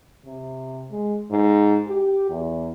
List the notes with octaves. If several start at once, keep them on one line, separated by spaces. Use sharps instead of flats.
C3
G#3
G#2
G4
E2